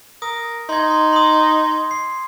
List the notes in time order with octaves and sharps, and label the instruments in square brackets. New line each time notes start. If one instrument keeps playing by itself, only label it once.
[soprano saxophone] A#4 [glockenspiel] D#6
[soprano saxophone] D#4 [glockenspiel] C6 G#6
[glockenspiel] C6
C6 D#6
C7